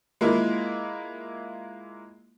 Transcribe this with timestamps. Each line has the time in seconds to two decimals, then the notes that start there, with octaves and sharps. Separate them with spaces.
0.21 G#3 A#3 E4 F4